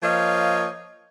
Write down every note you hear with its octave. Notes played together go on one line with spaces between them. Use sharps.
F3 A#3 C#5 D#5 F5